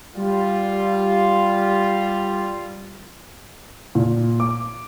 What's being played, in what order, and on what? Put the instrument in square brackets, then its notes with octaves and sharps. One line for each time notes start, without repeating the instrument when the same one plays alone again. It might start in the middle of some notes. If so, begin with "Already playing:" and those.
[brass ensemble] G3 F4
[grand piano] A#2
D6